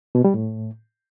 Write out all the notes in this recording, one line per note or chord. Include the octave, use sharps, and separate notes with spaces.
B2
G3
A2